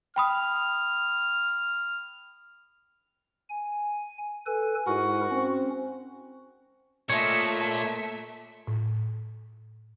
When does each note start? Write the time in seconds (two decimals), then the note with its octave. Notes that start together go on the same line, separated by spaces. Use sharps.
0.16 G5 B5 D#6 F6
3.49 G#5
4.46 A4 B4 G#5
4.87 G#2 E4 F#4 A#4
5.31 C4 C#4
7.10 A#2 A3 C#5 D#5 E5 B6
8.67 A2